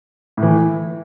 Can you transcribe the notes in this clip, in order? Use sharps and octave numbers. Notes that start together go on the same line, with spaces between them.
A2
E3